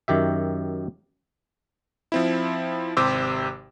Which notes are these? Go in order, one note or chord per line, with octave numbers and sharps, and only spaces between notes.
F#2 D#3 G4 E5
F3 C4 E4
G#1 C3 G4 C5 D6 E6